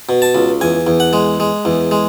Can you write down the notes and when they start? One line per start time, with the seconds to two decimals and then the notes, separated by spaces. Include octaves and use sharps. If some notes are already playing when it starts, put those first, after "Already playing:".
0.09 B2
0.22 A5
0.35 C#2
0.61 E2 G#5
0.87 E2
1.00 F#5
1.13 G#3
1.40 G#3
1.65 E2
1.91 G#3